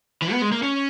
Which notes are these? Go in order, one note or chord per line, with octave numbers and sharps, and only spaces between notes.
E3
B3
G#3
A#3
C#4